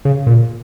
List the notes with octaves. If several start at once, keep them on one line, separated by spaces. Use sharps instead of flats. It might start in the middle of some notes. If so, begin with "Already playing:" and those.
C#3
A#2